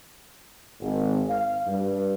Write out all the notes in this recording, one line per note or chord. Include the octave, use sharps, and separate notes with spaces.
G#1
F5
G2